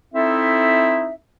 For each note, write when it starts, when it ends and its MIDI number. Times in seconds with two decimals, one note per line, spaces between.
0.14 1.12 60
0.14 1.12 63
0.14 1.12 64
0.14 1.12 69
0.14 1.12 76